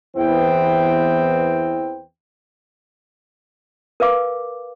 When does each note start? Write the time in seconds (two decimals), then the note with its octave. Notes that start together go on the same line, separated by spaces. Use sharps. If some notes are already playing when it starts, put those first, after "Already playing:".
0.16 E2 E3 B3 C4 G5
4.00 A#4 B4 F5 D6